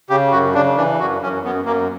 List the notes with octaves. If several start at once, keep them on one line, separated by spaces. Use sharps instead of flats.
C#3 G4
F#2 F#4
C#3 D4
E3 D4
F#2 F#4
F#2 C#4
F#2 B3
F#2 A#3